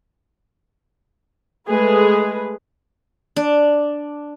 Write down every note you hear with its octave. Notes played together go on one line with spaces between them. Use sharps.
G#3 A3 G#4 B4
D4